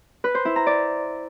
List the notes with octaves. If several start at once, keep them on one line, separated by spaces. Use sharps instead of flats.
B4
C5
E4
A#5
D5